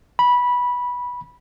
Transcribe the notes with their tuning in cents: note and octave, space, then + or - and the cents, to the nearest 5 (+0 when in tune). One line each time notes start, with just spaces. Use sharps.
B5 -15